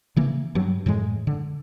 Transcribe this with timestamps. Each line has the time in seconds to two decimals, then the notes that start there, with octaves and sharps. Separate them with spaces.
0.16 C#3 E3 A#3
0.55 G2 F#3
0.86 F#2 A2 E3 G#3
1.27 D3